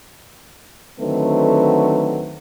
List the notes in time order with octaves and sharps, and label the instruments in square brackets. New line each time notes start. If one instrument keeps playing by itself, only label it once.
[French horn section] D3 D#3 F#3 A3 C4 B4